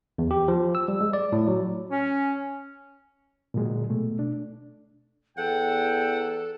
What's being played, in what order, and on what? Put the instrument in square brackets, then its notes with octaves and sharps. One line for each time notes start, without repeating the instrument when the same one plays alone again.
[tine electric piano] E2
G4
F3
E6
G3
G#3
D5
A2
F#3
[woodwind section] C#4
[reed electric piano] A#2 D3 F#3 G#3
B2 A3
D4
[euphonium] E2 [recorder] A4 [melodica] F#5 [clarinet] G5